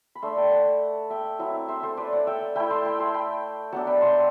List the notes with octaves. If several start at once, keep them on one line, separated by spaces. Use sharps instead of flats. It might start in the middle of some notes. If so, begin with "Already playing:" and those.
B5
A3 D4 A5 C6
G5 B5
F#5 A5
E5 G5
F#3 C4 E4
C5 E5
A4 C5
B4 D5
D5 F#5
E5 G5
A3 E4 G5 B5
A5 C6
G5 B5
A5 C6
G5 B5
F#3 B3 D4 F#5 A5
G5 B5
A5 C6